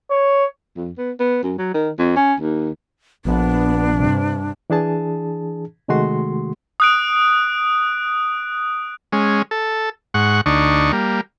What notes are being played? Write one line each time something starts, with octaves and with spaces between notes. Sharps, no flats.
C#5
F2
B3
B3
F#2
F#3
D#3
F2
C#4
D#2
A#1 B3 D4
G2 C3
E3 D4 G#4 A5
C3 D#3 G#3 A3 F#4 C6
D#6 F#6 D7
G#3 C#4
A4
G#2 F#5 C#6
D2 D4 D#4 C#6
G3 A#3